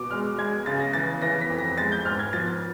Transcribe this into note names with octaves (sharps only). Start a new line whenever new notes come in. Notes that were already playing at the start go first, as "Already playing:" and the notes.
Already playing: B2 D6
G#3 F6
G#3 G#6
C#3 A6
A#6
E3 A6
E3 A#6
B6
F2
A#6
G#3 A6
G6
G#2 F6
G#6
F3 A6